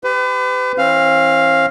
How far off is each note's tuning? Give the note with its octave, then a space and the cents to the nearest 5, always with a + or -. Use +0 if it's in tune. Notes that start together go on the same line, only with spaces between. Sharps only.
G4 +0 B4 +40
E3 +0 C4 +45 F5 +0